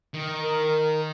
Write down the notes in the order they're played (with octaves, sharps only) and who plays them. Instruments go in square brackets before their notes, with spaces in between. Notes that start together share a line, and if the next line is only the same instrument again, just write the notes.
[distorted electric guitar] D#3
[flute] A#4